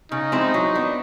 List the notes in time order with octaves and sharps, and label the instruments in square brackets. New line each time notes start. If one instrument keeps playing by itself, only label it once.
[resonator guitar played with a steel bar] C#3 [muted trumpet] D#4
[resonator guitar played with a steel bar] F3 G#3 C4 E4
F#3
B3 D4